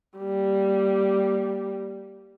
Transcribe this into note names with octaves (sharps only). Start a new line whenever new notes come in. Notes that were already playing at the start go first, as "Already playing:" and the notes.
G3 A#3